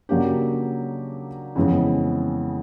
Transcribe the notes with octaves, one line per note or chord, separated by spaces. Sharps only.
C#3 F#3 A#3 D4 G4
F2 C#3 E3 G#3 B3